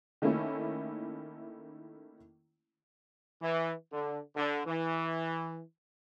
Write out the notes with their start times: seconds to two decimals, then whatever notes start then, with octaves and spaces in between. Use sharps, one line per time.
0.22 D#3 A3 A#3 C#4 E4
3.41 E3
3.92 D3
4.37 D3
4.66 E3